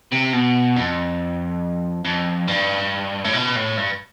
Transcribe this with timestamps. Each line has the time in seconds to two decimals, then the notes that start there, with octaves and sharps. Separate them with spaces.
0.12 C3
0.33 B2
0.76 F2
2.05 F2
2.48 G2
3.24 A2
3.33 B2
3.55 A2
3.77 G2